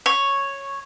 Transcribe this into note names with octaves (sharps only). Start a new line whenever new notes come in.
C#5